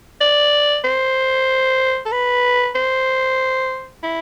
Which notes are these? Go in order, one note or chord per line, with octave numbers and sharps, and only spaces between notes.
D5
C5
A4
B4
C5
E4